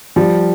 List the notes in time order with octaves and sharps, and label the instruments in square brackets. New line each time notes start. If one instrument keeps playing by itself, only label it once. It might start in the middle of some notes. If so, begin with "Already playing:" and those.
[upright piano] F3 [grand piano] G3